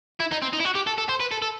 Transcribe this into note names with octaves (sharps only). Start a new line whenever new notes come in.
E4
D#4
C4
D#4
E4
F#4
G4
A4
A4
C5
B4
A4
A4